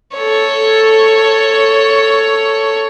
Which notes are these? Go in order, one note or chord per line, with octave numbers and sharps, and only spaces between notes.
A4 C#5